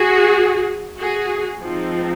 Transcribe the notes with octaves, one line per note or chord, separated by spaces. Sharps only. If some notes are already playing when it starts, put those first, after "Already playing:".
Already playing: F#4 G#4
F#4 G#4
F3 G#3 C4 D#4